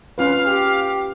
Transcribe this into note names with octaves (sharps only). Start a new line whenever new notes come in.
C#4 F4 B4 F5
G4